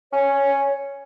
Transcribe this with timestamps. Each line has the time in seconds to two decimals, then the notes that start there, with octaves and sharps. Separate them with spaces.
0.13 C#4 C#5